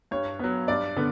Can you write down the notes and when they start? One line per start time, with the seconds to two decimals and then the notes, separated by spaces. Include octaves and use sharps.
0.11 G2 C#5
0.39 F#3 B3
0.68 G2 D5
0.97 D3 B3